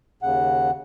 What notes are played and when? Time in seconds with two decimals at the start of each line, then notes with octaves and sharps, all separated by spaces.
0.22 D#2 C#3 F#5